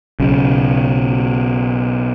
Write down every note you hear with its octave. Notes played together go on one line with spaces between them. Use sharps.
B1 C#3